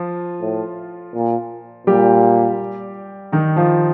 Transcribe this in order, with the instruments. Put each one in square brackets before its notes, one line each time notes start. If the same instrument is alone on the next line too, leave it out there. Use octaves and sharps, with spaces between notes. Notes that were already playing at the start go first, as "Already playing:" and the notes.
Already playing: [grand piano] F3 F4
[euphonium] A2
A#2
[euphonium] A#2 [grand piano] G3 G4
[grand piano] D#3 D#4
F3 F4